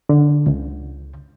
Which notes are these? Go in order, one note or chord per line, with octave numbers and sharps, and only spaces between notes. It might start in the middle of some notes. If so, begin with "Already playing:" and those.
D3
C#2